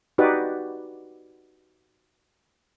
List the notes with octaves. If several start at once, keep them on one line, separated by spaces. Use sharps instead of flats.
D#4 F#4 G4 B4 D5